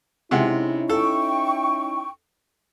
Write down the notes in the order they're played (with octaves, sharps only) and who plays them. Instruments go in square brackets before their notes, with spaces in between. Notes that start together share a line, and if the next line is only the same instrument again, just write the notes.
[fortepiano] C3 G#3 F#5 [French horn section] C#4 D#4 E4
[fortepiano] A4 [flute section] G5 C#6